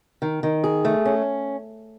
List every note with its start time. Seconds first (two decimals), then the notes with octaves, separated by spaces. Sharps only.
0.22 D#3
0.43 D#3
0.64 G#4
0.85 A3
1.05 C#4